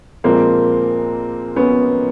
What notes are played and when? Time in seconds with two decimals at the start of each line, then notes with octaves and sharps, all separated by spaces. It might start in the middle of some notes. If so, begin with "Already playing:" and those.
0.24 A#2 F3 G#3 A#3 C4
1.56 B3 C#4